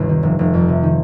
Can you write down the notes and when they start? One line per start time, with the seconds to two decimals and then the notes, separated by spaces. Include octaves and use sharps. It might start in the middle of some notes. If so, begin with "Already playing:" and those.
Already playing: G1 D#2 C3 G3
0.09 D#3
0.23 F1
0.39 F1
0.54 F2
0.69 C3
0.83 D#3